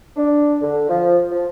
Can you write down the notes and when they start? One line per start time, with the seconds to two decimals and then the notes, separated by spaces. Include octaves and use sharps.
0.17 D4
0.62 D3
0.89 F3
1.32 F3